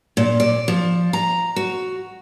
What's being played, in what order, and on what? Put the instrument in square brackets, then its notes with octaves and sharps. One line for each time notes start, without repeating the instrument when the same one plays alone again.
[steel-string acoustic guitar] A#2
D5
F3
A#5
F#4